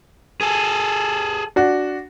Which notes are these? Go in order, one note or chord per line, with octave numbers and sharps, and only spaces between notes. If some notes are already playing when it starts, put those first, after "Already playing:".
G#4 A4
D4 F#4